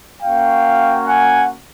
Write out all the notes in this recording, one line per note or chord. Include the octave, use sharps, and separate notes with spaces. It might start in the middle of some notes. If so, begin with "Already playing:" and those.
A#3 C#4 F#4 F5 G5
F#5 G#5